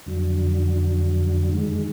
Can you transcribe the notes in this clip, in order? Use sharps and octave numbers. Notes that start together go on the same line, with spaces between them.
F2 D3 F#3
F#2 D#3 G#3